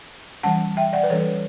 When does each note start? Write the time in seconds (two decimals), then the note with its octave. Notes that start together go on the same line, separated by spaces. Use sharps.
0.43 E3 G3 C#4 F#5 A5
0.77 E5 G5
0.93 D5 F#5
1.03 B4
1.10 E3 G3 C#4 A4 C#5